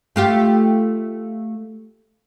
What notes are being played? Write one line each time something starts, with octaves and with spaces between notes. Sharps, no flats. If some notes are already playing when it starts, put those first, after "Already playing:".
A3 F4 G4